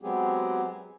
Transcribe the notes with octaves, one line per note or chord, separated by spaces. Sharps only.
F#3 G#3 B3 C4 G4 G#4